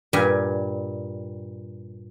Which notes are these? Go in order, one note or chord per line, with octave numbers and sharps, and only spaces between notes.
G2 A#2 G3 G#5